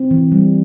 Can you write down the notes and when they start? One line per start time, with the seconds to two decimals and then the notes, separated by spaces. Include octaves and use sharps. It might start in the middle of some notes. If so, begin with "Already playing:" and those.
Already playing: C4
0.11 E3
0.32 G3